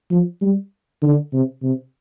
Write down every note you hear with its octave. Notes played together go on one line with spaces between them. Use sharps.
F3
G3
D3
C3
C3